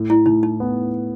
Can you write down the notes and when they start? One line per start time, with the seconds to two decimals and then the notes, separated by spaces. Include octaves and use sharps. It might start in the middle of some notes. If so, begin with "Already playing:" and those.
Already playing: A2
0.10 E4
0.26 A2 D#4
0.43 D#4
0.60 B3